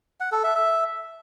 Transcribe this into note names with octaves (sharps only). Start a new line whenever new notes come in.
F#5
A4
E5
E5